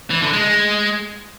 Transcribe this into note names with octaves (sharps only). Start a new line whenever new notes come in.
E3
D3
G#3
G#3